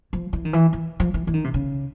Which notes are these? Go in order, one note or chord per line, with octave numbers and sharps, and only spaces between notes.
F3
E3
D#3
E3
E3
F3
E3
E3
D#3
C3
C#3